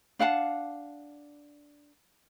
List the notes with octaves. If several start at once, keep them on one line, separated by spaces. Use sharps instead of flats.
D4 F5 F#5 A5